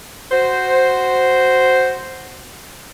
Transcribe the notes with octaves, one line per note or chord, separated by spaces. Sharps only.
F#4 C5